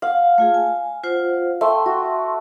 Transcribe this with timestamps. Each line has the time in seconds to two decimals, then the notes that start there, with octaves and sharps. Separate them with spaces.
0.02 F5 F#5
0.38 A3 F4 G#4
0.54 G#5
1.03 F4 C5 F#5
1.61 A3 E5 G5 C6
1.86 F#4